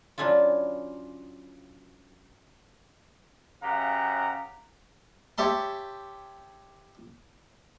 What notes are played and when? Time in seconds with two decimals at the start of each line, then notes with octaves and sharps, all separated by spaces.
0.18 F#3 C#4 D4 E4 F4
3.63 F#2 C#3 G4 F5 F#5 A#5
5.38 G4 C#5 E5 A5 C6